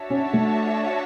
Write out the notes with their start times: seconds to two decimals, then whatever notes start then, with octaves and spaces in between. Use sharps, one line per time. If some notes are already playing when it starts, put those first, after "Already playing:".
Already playing: D4 F#4 C#5 E5 A5
0.10 C#4
0.33 A3